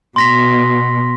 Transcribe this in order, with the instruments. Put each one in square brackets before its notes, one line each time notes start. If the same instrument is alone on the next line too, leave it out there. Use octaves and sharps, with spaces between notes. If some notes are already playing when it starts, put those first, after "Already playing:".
[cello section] B2 [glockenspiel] C6 A#6 B6